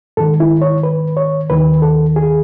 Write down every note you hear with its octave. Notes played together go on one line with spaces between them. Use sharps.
G#2 D#3 A4
E4
C#5
B4
C#5
D#2 D#3 B4
A4
G#4